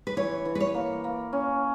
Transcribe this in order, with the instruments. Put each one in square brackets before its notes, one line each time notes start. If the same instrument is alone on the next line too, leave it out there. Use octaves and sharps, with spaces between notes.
[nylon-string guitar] B4
[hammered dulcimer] E3 [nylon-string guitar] C#5
[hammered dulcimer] E3
[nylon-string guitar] B4
C#5
[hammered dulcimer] A#3
A#3
C#4